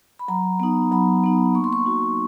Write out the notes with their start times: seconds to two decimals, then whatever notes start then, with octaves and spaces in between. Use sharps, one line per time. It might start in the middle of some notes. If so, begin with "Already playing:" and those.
0.19 B5
0.28 F#3 A#5
0.60 B3 D#4
0.92 F#3 B5
1.24 B3 D#4
1.55 A#3 C#6
1.64 C6
1.73 C#6
1.86 D#4 F#4